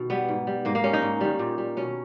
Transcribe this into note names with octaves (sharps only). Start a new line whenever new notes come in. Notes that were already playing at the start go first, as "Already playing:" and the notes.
Already playing: B2 D#3
G3 B3
G#2
G3
G#2 A#3
A#3
G3 C#4
D#4
G#2
D#3 G3
A#2
G3
B2 C#4